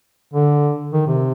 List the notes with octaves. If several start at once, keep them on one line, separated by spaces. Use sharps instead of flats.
D3
D#3
C3